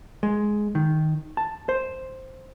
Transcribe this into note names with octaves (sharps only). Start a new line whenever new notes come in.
G#3
D#3
A5
C5